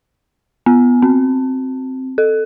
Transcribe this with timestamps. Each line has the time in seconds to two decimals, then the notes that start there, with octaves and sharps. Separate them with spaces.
0.66 B3
1.02 C4
2.18 A4